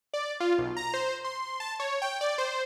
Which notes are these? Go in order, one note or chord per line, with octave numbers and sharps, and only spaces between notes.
D5
F4
B1
A#5
C5
C6
A5
C#5
G5
D5
C5